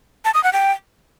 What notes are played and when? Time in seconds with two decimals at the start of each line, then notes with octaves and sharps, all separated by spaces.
0.25 A5
0.34 D#6
0.44 F#5
0.53 G5